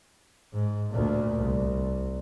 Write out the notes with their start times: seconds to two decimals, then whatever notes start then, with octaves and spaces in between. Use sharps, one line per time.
0.53 G#2
0.91 D2 A#2
1.40 C2